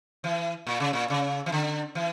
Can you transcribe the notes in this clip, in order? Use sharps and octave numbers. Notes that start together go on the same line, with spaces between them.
E3
A#2
C#3
A#2
C#3
E3
D3
E3